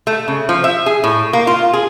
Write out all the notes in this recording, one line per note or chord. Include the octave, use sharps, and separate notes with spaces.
A3
C#3
F3
E5
G#4
A2
A#3
F4
G#4